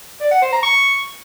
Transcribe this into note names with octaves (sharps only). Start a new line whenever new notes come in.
D5
F#5
C5
A#5
C#6